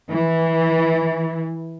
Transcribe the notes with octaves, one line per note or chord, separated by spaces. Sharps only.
E3